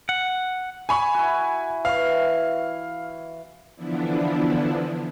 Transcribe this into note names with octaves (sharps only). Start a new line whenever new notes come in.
F#5
G#5 B5 C#6
E4 F#4
E3 F5 C#6
D3 E3 F3 B3 D4 E4